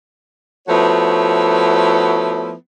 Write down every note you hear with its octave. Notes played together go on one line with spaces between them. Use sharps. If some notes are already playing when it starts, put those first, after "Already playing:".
F3 A3 B3 E4 F#4 C#5